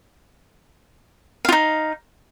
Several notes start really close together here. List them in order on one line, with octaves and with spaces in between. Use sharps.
F5 F4 D#4